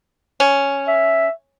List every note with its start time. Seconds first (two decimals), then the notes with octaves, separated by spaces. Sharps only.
0.40 C#4
0.88 E5